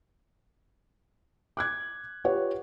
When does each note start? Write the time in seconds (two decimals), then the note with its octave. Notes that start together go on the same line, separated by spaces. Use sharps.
1.57 D6 F#6 G#6
2.24 F4 G4 B4 C#5 F#5